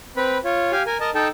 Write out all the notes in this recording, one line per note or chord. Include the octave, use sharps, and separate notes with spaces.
C4 B4 B5
F4 C#5
G4 F5 G#5
A#4 G#5
A#4 D#5 A5
D#4 A4 G5 A5